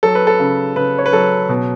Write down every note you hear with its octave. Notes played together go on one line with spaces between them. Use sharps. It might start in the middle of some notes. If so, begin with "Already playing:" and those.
F#3 A4
B4
A4
C#3
C#3 B4
C#5
B4
F#3 A4
B2